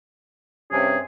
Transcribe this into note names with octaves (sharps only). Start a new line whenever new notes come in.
G2 C3 C#4 G#4